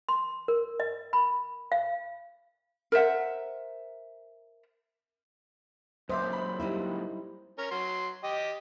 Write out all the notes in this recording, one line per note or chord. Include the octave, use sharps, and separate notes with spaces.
C6
A#4
D#5
B5
F5
A#4 C5 E5 F#5
F#2 A#2 C5 D#5 E5 D6
B5
G3 D#4 E4
C#4 A#4
F#3 C6
G4 D#5